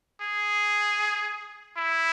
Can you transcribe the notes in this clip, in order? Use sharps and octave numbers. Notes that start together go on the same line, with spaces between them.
G#4
E4